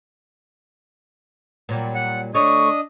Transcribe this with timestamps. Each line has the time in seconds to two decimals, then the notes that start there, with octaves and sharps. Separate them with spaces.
1.69 A#2 F#3 G3
1.95 F#5
2.35 D2 A3 D4 C#5 D#5 C#6